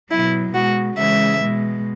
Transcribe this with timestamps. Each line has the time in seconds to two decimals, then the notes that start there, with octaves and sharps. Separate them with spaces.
0.10 B2 F#3 E4
0.54 B2 G#3 F#4
0.98 C#3 E3 G#3 E5
1.41 G#3
1.46 B2